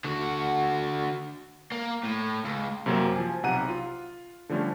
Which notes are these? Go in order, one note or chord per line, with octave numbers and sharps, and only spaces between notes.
D3 F#4
A#3
A2
C#2
F#2 C3 F#3 A#3 C4 C#4
F3 G#5
B1 C3 F#5 A#5 D#7
F4
D3 F3 G3 A3 C#4